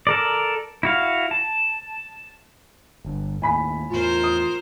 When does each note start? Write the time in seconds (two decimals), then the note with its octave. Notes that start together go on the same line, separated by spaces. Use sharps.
0.07 A4 A#4 D5
0.83 E4 F#4 F5
1.31 A5
3.05 G1 G2
3.42 D#2 A2 G#5 B5 B6
3.90 E2 A2 F4 A#4 C5
4.24 D#6